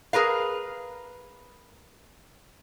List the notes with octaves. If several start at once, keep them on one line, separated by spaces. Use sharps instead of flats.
G#4 A#4 B4 F5